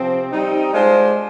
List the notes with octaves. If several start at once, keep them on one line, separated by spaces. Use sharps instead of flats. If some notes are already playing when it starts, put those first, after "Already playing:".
Already playing: C3 F3 C4
G3 C4 D#4
G#3 D4 F4 C5